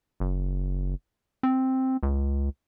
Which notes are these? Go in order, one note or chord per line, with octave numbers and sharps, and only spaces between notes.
F#1
C4
C#2